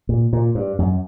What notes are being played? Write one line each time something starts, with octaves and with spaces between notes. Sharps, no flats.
A#2
A#2
G2
F#2